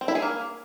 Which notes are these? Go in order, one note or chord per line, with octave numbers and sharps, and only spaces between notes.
C4
E4
G#4
A#3